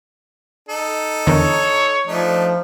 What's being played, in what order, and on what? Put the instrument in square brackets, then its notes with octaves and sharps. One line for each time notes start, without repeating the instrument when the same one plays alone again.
[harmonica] D#4 A4
[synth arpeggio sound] E2 D3 D#3 [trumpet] C#5
[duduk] F3 [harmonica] A3 D4 D#4